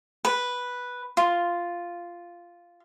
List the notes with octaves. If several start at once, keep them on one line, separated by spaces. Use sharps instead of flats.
B4
F4